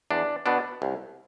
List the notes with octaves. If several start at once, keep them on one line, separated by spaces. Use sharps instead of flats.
E2 D4
B2 B3 D4
C2